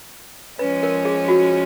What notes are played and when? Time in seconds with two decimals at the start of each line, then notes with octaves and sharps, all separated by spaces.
0.59 F3 G#3 C#4 B4
0.83 A#4
1.05 G#4
1.28 F#4